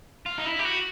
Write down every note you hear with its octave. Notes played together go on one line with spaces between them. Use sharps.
F4
D#4
E4
G4
F#4